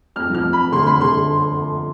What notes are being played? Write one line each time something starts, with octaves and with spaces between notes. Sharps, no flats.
F2 F6
F3 F6
F2
B5
F2
D3 C6
C6
F2 B5
D3 C6
D3